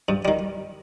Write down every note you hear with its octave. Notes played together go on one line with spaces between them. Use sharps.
G2
D#3 G3